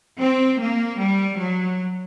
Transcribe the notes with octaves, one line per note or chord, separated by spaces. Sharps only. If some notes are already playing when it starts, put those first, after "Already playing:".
C4
A#3
G3
F#3